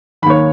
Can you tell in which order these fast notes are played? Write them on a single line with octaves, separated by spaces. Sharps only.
D#3 B5 D#2 C#5